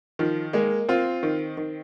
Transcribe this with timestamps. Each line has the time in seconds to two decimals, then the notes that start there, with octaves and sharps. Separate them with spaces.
0.19 D#3 F3
0.53 G#3 A#3
0.89 C4 F4
1.23 D#3
1.57 D#3